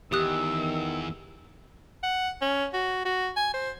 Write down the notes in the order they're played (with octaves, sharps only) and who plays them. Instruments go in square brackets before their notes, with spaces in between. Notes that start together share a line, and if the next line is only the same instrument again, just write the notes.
[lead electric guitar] E2 [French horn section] D#3 [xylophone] G4 D#6 F#6 [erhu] E6
[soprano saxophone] F#5
C#4
F#4
F#4
G#5
C5